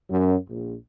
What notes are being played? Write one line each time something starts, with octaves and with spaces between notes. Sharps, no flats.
F#2
A#1